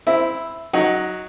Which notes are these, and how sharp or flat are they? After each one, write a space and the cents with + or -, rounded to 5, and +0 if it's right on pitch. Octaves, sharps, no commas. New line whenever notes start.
C4 -15 E4 +0 E5 +0
F#3 +0 D#4 +10 F#5 +0